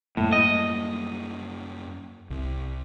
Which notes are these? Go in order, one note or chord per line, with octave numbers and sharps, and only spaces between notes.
F#2 A2 G3 A#3
D#5
C2